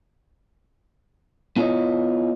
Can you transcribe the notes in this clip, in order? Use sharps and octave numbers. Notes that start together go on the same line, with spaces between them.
B3 E4 F4 C#5 D#5